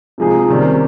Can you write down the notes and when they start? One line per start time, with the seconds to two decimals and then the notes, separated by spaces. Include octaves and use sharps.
0.18 C3 F3 G#3 D#4 G#4
0.49 C3 D#3 G3 C#4